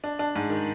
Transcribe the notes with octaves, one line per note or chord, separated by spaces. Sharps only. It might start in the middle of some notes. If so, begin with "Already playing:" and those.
D4
D4
G#2
D#3